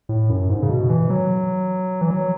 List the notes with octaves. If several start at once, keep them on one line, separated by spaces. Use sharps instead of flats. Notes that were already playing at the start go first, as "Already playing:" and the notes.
A2
F#2
G#2
C#3
B2
E3
F#3
E3
F#3